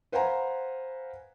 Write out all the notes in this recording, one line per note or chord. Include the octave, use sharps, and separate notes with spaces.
B4 C5 F5 F#5 G#5 A#5